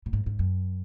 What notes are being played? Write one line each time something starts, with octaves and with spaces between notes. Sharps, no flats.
A#2
G#2
G#2
F#2